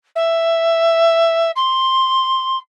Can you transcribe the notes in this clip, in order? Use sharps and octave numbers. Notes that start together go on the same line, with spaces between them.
E5
C6